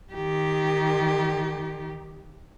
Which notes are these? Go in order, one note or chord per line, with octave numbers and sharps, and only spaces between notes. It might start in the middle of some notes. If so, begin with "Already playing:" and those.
D#3 G4